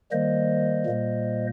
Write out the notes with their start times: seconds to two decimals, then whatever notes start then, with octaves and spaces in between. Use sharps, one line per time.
0.11 D#3 G3 A#3 C5 D#5
0.86 A#2 G3 A#3